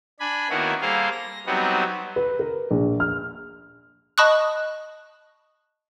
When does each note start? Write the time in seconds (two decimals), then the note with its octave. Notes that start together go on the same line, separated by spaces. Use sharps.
0.20 D4 G#5 B5
0.50 D#3 A#3 B3 C#4 E4 F#4
0.81 G3 A#3 G#4 A4 C5 F5
1.12 A#6
1.46 F#3 G3 B3 C4 D#4 F#4
2.16 B4
2.39 A#4
2.71 A#1
3.00 F6
4.18 D#5 A5 B5 C#6 D#6 F#6